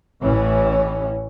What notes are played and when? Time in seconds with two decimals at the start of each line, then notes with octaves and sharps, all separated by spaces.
0.22 A1 A2 E3 C#4